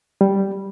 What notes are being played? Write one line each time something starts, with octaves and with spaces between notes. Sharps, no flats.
G3